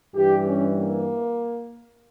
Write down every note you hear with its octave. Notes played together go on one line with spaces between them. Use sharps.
G2 E3 G3 G4
C#4
A#3